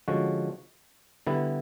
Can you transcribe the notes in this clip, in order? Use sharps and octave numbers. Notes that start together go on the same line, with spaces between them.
D3 F3 G#3 C#4 F#4
D3 G3 B3 E4